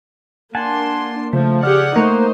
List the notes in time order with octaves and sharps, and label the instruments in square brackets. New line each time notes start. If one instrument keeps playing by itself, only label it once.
[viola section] A#3 D4 C6 [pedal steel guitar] F#5 G#5 A5
[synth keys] C#3 [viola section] F3 [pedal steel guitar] A3
[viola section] G4 G#4 F#5 [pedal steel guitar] D5 F6
[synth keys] A3 A#4 C#6 [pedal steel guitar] A#3 A#5 F#6 [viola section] D#4 C5